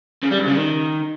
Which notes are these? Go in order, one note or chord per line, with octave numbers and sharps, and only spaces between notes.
C#3
G3
G2
C#3
D#3